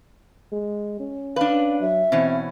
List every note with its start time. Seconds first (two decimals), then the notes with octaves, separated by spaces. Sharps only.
0.52 G#3
1.00 C#4
1.36 D4 B4 F5
1.81 F#3 E5
2.12 B2 E3 C4 C#4